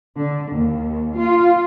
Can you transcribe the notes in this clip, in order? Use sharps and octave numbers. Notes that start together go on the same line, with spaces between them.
D3
D#2
F4